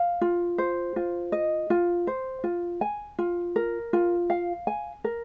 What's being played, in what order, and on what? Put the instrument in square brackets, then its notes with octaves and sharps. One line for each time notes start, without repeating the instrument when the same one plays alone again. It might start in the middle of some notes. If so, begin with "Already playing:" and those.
Already playing: [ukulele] F5
F4
C5
F4
D#5
F4
C5
F4
G#5
F4
A#4
F4
F5
G#5
A#4